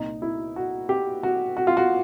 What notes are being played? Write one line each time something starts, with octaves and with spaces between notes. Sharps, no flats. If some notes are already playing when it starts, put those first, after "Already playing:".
Already playing: C2 A#2 D#4
E4
F#4
G4
F#4
F#4
F4
F#4